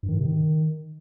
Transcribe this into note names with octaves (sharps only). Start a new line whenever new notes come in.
G2
D#3
G#2
C3
D#3